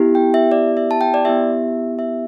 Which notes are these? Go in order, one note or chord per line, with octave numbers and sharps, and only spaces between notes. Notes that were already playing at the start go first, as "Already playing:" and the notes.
Already playing: B3 E4 G4
G5
E5
D5
E5
A5
G5
D5
B3 E4 G4 E5
E5